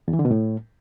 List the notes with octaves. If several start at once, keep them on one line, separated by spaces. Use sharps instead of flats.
E2
E3
D3
B2
A2